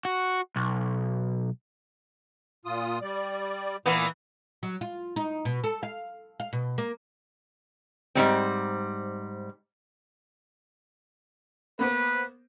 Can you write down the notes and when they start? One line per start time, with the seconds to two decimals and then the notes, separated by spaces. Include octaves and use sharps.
0.05 F#4
0.56 B1
2.65 A#2 F4 D#6
3.01 G3 D5
3.86 A#2 E3 A#3 B3
4.63 F#3
4.81 F4
5.16 D#4
5.45 B2
5.64 A4
5.83 F5
6.40 F5
6.53 B2
6.78 A#3
8.15 G#2 G3 C4
11.79 A#3 B3 B4 C5